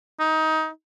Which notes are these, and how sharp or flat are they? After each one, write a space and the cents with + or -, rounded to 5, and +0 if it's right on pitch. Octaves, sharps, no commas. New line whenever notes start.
D#4 +20